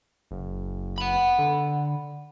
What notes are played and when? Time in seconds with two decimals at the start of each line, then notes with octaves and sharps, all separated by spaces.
0.31 F#1
0.98 F#5 B5
1.38 D3